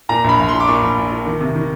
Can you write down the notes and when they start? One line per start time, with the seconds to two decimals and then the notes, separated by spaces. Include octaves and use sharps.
0.09 A#2 A#5
0.24 A#1 B5
0.39 A#1
0.49 A#2 C6
0.60 D6
0.68 A#2 C#6
0.82 A#1
0.97 A#1
1.11 A#2
1.26 D#3
1.40 C3
1.55 D#3